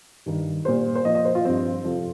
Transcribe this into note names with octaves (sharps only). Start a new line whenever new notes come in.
G2 D#3 G3
A#2 G3 C5
C5
A#2 F3 D#5
D#5
C5
F4
G2 F3 C4
F2 C3 F3